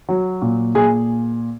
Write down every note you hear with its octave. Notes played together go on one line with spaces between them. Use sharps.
F#3
A#2
A#2 G#4